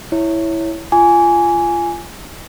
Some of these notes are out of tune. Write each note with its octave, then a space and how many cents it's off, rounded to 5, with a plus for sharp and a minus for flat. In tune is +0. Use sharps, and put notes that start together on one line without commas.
E4 +0 C#5 +0
F4 -25 G#5 +0 D6 -35